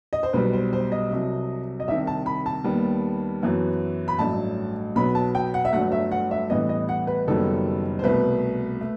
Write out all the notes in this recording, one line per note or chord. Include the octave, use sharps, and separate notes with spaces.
D#5
C5
B1 B2 G3 B4
C5
C5
D#5
C2 C3 F#3
D#5
C2 C3 D#3 E5
A5
B5
A5
D#2 D#3 G3 B3
F#2 E3 B3
B5
A1 G2 F#3 A3 A5
B1 B2 F#3 B3 B5
A5
G5
F#5
E5
G1 G2 F#3 A3 F#5
E5
F#5
E5
A1 A2 E3 G3 B3 D#5
D#5
F#5
B4
F#1 F#2 D#3 G3 B3 A4
C5
C2 B2 A3 B4
A3